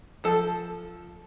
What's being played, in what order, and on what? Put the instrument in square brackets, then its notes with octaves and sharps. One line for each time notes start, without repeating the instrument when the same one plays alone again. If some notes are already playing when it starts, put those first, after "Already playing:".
[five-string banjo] F3 A4 A5